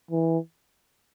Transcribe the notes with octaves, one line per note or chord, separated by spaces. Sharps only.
E3